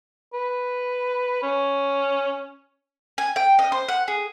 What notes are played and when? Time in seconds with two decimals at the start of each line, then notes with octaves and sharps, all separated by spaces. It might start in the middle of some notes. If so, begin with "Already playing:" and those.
0.34 B4
1.43 C#4
3.18 G#5
3.36 G5
3.59 D#5
3.72 C5
3.89 F#5
4.08 G#4